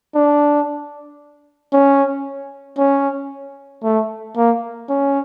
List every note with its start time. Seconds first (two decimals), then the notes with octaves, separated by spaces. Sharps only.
0.15 D4
1.73 C#4
2.78 C#4
3.84 A3
4.37 A#3
4.89 C#4